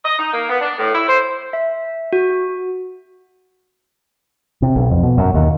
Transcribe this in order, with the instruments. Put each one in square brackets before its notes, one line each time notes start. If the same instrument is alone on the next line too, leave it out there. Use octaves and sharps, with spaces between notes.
[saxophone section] D#5
D#4
A#3
B3
D4
A2
E4
C5
[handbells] E5
F#4
[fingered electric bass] C3
B1
F2
B2
F#2
D#2